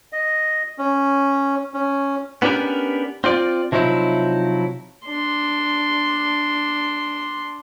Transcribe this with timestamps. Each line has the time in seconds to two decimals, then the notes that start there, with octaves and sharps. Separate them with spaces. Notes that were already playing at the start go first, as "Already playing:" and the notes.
0.12 D#5
0.78 C#4
1.74 C#4
2.42 B3 C#4 D4 G4 A#4
3.24 C4 F4 D5
3.72 C3 F3 F#3 D#4 E4
5.06 D4 C6